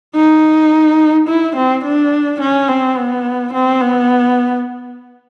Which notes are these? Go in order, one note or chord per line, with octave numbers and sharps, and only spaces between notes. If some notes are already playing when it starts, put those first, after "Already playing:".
D#4
E4
C4
D4
C#4
C4
B3
C4
B3